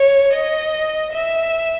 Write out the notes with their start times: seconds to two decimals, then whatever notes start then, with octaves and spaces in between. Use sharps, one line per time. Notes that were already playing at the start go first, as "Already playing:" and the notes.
Already playing: C#5
0.34 D#5
1.13 E5